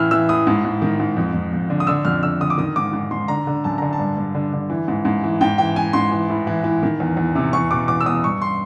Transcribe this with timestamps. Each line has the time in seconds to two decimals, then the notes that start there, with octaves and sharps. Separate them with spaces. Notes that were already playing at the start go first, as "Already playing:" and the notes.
Already playing: A2 E3 E6 F6
0.11 E3 E6
0.29 A2 D#6
0.47 G#2
0.64 G#2
0.82 D#3
1.00 G#2
1.17 F2
1.34 F2
1.53 F2
1.70 D3
1.80 D#6
1.87 D3 E6
2.05 F2 F6
2.23 D3 E6
2.40 D3 D#6
2.50 D6
2.58 D#3 D#6
2.76 G#2 D6
2.93 G#2
3.11 G#2 C6
3.28 D3 A#5
3.47 D3
3.64 F#2 A5
3.78 D3 A#5
3.93 A5
3.99 G2
4.17 G2
4.35 D3
4.53 D3
4.70 E3
4.88 G#2
5.05 G#2
5.24 E3
5.41 G#2 G5
5.58 E3 G5
5.76 E3 G#5
5.93 G#2 C6
6.11 E3
6.30 A2
6.47 E3
6.64 E3
6.83 D#3
7.00 E2
7.17 E2
7.35 C3
7.53 E2 C#6
7.71 B2 D6
7.88 E2 D6
8.01 E6
8.06 E2 D#6
8.24 G2 C#6
8.42 C6